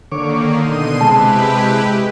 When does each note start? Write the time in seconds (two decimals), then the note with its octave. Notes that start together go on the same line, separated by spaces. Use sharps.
0.12 D3 D#3 A#3 C#5 D6
0.58 B2 D#4 C6 D#7
1.01 C3 G#3 E4 G4 B4 A5